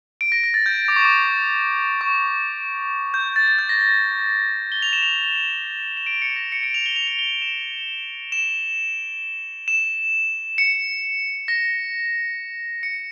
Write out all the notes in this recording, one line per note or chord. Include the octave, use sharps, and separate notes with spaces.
D7
A#6
A#6
A6
G6
D6
C#6
D6
C#6
G6
A6
A6
G6
A#6
A#6
G7
F7
E7
F7
E7
D7
C#7
A#6
C#7
D7
F7
G7
F7
F7
G7
E7
E7
E7
C#7
A#6
C#7